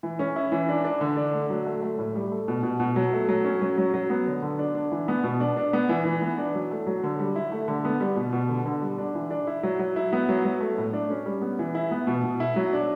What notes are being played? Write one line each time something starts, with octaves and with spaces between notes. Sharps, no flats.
E3
C#4
E4
E3
D4
D4
D3
D4
A3
F#3
A3
A3
A2
G3
A3
B2
B2
B2
F#3
A3
F#3
C#4
F#3
F#3
F#3
B3
D3
D3
D4
D4
E3
B3
B2
D4
D4
B3
E3
E3
B3
D4
F#3
A3
F#3
D3
G3
E4
A3
D3
B3
G3
B2
B2
D3
D3
G3
D4
E3
D4
E4
F#3
F#3
E4
B3
F#3
F#3
A3
A2
D4
C#4
G3
B3
E3
E4
B3
B2
B2
E4
F#3
D4